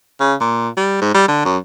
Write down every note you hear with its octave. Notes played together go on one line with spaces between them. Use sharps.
C#3
A#2
G3
G#2
G3
D3
F#2